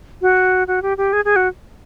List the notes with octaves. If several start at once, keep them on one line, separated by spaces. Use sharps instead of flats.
F#4
F#4
G4
G4
G#4
G#4
F#4